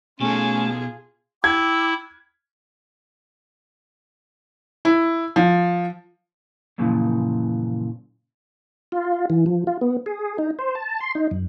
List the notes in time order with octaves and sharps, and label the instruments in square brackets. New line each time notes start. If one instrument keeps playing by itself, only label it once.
[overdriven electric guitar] B2 A4 [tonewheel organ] A3 [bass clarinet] C#4 [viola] F4 G#4
[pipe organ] E4 [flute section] G5 D6 E6 [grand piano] G#6
[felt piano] E4
F3
[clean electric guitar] F#2 A#2 C#3 E3 F3
[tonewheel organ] F4
E3
F3
F4
B3
G#4
D#4
C5
A5
C6
D#4
F#2